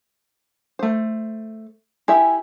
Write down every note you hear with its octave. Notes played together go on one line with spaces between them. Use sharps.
A3 C5
E4 G4 E5 G#5